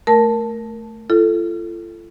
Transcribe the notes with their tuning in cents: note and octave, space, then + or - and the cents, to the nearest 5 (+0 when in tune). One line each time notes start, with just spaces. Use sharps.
A3 +0 A#4 +0 A5 +0
F4 -40 A4 +0